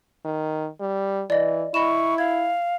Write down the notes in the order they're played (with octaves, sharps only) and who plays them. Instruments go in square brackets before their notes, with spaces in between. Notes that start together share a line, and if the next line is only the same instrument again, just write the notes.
[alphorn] D#3
G3
[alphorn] E3 [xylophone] D5 D#5
[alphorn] E4 [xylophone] D#5 B5 E7 [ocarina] C#6
[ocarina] F5 [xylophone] G#6